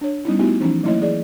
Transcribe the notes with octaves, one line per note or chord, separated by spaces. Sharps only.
D4 C#5
G3 B3 C#4 D#4 E4
A3 B3 D#4 E4 F#4 G4
E3 F3 C#4 D#4
F#3 A3 A#3 E4 C#5 D#5
E3 G#4 D5